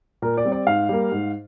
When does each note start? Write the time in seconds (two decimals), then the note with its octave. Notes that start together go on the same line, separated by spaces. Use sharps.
0.22 A#2 A#4
0.37 D5
0.45 G3 C4
0.52 D5
0.67 G#2 F5
0.89 G3 A#3
1.12 G#2